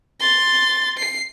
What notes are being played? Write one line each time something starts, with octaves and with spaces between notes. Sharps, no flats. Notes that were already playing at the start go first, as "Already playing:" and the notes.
C6 A6
C7